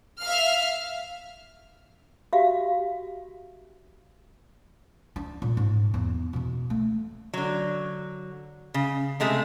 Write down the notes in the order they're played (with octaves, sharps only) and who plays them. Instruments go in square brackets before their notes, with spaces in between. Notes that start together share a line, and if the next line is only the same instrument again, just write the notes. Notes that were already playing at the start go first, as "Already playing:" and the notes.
[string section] E5 F5 F6
[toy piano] F#4 G4 E5 F5
[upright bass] D4
A#2 G3
G#2
E2
B2 E3
A3
[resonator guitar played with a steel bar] D3 F#3
C#3
C3 G#3 A3 G#4